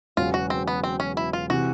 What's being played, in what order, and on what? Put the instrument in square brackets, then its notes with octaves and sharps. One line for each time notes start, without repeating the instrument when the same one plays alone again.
[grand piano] E1 E2 C#3 F#3 B3 [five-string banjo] F4
[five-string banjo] F#4
C4
B3
C4
C#4
E4
F4
[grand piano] C3 E3 [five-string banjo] F#4